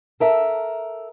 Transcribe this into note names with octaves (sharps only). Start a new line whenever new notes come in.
A4 A#4 E5